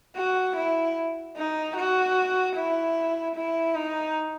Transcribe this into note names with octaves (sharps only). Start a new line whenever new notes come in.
F#4
E4
D#4
F#4
E4
E4
D#4